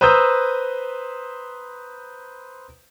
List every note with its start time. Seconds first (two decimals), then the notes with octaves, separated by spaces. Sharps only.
0.01 B4 C5 A#5 D#6 E6 G6